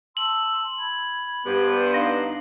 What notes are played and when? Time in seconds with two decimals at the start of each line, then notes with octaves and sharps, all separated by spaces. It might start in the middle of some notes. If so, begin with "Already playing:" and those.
0.17 A5 C6 E6 F#7
0.78 B5 G#6
1.46 G2 B3 C5
1.94 D4 D#4 F5 A#6